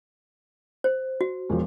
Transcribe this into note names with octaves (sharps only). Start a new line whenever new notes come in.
C5
F#4
E1 F3